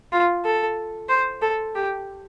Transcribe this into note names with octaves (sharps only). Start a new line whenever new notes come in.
F4
A4
C5
A4
G4